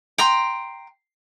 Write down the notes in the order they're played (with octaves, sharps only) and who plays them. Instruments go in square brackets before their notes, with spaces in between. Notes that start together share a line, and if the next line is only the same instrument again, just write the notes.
[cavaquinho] G5 A#5 C6